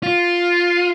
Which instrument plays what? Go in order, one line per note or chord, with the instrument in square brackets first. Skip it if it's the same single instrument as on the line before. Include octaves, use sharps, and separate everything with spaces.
[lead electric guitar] F4